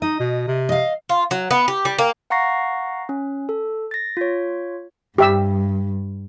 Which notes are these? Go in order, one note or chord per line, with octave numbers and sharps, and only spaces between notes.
D#4 D#5
B2
C3
D#5 F5
F4
F#3
B3
G4
G3
A#3
F5 F#5 A#5 C#6 A#6 C7
C#4
A4
A6 A#6
F4 C#5
G2 G4 E5 E6